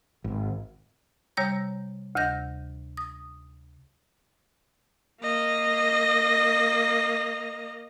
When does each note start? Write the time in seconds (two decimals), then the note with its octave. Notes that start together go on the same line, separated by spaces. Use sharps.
0.24 G#1
1.37 C3 G3 C#5 A#5 G6
2.15 D2 C3 D#5 G6 A#6
2.97 D#6
5.22 A#3 D#5